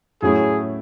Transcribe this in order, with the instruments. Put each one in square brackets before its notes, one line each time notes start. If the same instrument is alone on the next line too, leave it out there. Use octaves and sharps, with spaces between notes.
[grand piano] A2 F#3 A3 C#4 E4 [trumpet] G#4